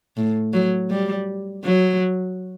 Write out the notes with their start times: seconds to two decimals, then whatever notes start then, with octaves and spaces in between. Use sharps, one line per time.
0.17 A2
0.53 F#3
0.90 G3
1.64 F#3